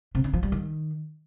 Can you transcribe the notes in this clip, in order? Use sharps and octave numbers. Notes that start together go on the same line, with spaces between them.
C3
D3
F3
G3
D#3